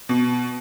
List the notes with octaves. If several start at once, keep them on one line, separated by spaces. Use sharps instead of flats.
B2